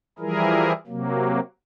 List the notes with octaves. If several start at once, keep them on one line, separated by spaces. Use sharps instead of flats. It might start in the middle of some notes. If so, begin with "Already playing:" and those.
E3 F3 G3 E4 G#4 A#4
C3 F#3 A#3